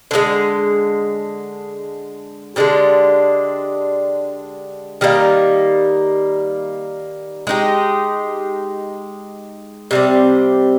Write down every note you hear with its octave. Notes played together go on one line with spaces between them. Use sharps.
D3 F3 G#3
D3 G#3 D4 G4
D#3 G3 A#3 D#4
G#3 D#4 G4
C3 G3 C4